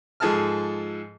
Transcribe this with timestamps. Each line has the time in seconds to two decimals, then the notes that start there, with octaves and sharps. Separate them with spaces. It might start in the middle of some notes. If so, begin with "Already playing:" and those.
0.20 G#2 F3 G#4 A4 A5 F6